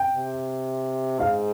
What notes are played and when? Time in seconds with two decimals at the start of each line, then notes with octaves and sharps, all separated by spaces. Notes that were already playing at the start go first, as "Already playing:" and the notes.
Already playing: G5
0.14 C3
1.20 G#2 F5